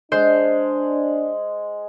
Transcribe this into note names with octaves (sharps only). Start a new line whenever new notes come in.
G#3 D4 C5